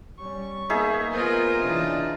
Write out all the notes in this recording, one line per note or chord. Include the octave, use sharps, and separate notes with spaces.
G3 C#4 C#6
A#3 B3 D#4 G#4 E5
B3 F4 A#4 C5 D#5
C#3 E3 D4